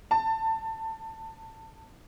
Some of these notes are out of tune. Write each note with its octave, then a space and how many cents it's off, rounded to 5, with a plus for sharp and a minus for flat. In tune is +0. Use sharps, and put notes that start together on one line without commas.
A5 +20